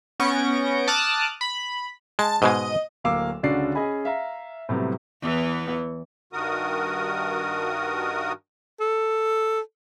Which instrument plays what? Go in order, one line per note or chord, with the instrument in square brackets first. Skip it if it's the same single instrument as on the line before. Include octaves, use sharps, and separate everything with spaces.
[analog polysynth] B3 C#4 C#6 G6 A#6 D7
A5 D6 D#6 F6 F#6
B5
[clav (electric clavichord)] G#3 [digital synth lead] A5
[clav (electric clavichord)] G#2 B2 G#3 [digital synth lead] D#5
[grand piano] D1 A#3 F5 D6 E6
C#2 D3 C#4 F#4 D5 C7
C#4 G#4 D#5 G#5 B5
E5 F5 A#5
A2 C3 F#3 G3 B3
[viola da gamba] E2 E3 B3
[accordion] G2 D#3 F#4 A#4 D#6
[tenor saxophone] A4